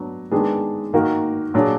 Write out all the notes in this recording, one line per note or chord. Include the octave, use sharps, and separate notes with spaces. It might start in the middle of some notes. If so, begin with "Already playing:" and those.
Already playing: F#3 B3 D4
D#3 G#3 B3 D4 G#4
D#3 A#3 D#4 F#4 A#4
A#2 F#3 D4 G#4